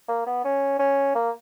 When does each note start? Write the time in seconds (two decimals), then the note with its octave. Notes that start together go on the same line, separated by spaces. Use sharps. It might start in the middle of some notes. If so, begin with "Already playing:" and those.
0.08 A#3
0.27 B3
0.45 C#4
0.79 C#4
1.15 A#3